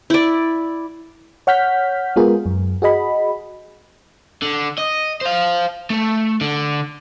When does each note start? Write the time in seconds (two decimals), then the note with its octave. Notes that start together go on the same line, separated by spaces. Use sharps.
0.10 E4 D5
1.47 C#5 F#5 F6 G6 B6
2.16 G#3 B3 F4 G#4 A#4
2.46 F#2
2.82 F#4 G#4 D#5 B5
4.42 D3
4.78 D#5
5.21 C5 F5
5.90 A3
6.41 D3